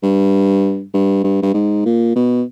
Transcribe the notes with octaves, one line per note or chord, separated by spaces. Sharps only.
G2
G2
G2
G2
G#2
A#2
B2